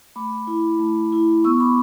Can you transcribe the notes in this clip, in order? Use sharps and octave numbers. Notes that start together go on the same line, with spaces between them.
A3 B5 D6
E4
A3
E4
B3 C#6 E6
B5 D6